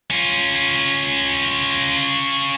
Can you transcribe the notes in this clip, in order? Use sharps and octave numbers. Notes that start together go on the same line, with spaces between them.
C#4 F4